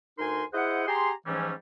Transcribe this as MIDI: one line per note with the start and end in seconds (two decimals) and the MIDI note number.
0.19 0.43 38
0.19 0.43 63
0.19 0.43 70
0.19 0.43 80
0.19 0.43 84
0.53 0.86 64
0.53 0.86 68
0.53 0.86 72
0.53 0.86 75
0.53 0.86 78
0.88 1.11 67
0.88 1.11 68
0.88 1.11 80
0.88 1.11 82
0.88 1.11 84
1.26 1.52 44
1.26 1.52 52
1.26 1.52 53
1.26 1.52 55
1.26 1.52 57
1.26 1.52 61